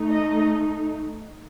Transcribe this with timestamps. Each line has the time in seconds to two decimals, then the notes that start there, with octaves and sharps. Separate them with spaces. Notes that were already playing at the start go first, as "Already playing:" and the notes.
Already playing: A3 D#4
0.10 D#5